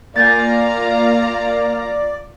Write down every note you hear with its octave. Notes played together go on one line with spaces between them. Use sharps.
A#3 F4 D5 F5 G#5 A#5 G6 A6